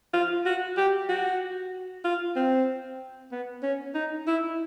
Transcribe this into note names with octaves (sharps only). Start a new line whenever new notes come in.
F4
F#4
G4
F#4
F4
C4
B3
C#4
D#4
E4